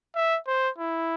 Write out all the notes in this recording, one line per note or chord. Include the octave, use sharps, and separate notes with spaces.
E5
C5
E4